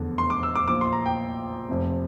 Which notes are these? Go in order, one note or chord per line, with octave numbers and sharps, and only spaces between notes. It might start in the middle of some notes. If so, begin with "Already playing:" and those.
Already playing: F1 E2 D3
C6
D6
E6
D6
A#1 A#2 D6
C6
A#5
G5
F1 F2 C3